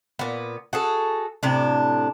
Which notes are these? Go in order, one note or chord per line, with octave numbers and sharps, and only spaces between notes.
A#2 B3
F#4 G#4 A4
A2 C3 D4